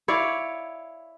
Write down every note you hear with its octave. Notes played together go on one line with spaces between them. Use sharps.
E4 C#5 D5 F5